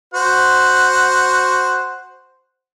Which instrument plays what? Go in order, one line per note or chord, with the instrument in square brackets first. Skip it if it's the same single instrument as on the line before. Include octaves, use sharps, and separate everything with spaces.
[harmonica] F#4 C5 F#5